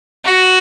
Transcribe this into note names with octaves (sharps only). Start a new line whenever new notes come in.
F#4